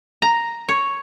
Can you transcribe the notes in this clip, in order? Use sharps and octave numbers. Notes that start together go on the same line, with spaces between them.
A#5
C#5